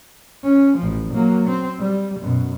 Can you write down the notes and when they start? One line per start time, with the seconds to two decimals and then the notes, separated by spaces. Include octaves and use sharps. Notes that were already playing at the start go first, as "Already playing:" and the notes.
0.44 C#4
0.78 A1 F3
1.14 F#3 A#3
1.48 C4
1.80 G3
2.20 F#2 B2